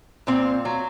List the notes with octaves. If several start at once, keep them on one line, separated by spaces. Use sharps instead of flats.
A#2 C4
F#3